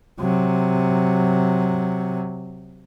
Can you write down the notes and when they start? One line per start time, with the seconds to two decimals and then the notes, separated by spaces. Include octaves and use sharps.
0.20 C3 F#3